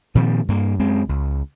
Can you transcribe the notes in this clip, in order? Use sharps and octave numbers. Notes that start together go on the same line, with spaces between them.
A#2 D#3 F3 C4
G2 A#3
F#2 G#3 C4
C#2